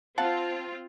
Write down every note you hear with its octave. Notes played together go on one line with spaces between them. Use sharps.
C4 F4 F5 F#5 A5